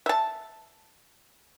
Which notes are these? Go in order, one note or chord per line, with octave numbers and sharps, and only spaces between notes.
E5 A5